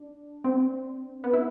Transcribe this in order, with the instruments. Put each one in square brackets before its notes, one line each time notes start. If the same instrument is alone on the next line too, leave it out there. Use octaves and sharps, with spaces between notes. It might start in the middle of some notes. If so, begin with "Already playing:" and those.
Already playing: [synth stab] D4
C4
B3
E4